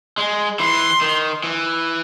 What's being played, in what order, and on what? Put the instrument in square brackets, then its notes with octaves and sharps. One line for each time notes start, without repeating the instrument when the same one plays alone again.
[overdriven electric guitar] G#3
[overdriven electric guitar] E3 [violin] C6
[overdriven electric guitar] D#3
E3